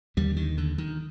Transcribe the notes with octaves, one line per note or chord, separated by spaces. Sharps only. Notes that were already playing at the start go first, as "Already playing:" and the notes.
D#2 D3 G3
D#3
D3
D#3